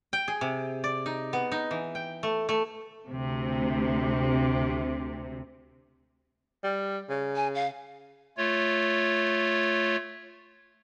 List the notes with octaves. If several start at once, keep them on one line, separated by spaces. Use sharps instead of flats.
G5
G#4
C3
D5
D#4
B3
D#4
E3
G5
A3
A3
D2 C3
G3
C#3
G#5
F5
A3 F4 C#5